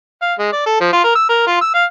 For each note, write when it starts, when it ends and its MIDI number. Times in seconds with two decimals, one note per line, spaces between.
0.22 0.34 77
0.38 0.52 56
0.53 0.62 74
0.66 0.76 69
0.80 0.90 53
0.93 1.02 65
1.04 1.14 70
1.15 1.24 88
1.29 1.43 70
1.47 1.60 65
1.61 1.72 88
1.75 1.84 77